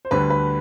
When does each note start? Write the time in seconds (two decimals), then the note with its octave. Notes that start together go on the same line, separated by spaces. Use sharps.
0.05 C5
0.11 D2 D3 G3 B4
0.30 B4